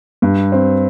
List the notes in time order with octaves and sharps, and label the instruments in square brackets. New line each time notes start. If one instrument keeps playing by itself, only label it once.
[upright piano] G2
C4